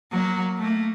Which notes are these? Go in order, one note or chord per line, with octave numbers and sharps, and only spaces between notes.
F#3 A#3
A3 A#3